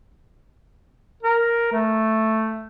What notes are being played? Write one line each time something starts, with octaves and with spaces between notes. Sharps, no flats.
A#4
A3